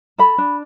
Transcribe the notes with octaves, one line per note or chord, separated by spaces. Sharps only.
A4 B5
D4